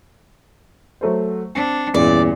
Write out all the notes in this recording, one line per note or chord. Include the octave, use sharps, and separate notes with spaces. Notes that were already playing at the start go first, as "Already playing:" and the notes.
F#3 A3 C5
C4 D4
E2 G2 A#2 C#4 D5